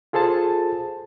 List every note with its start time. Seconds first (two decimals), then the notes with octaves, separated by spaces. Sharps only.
0.13 F4 G#4 A4 C5 A5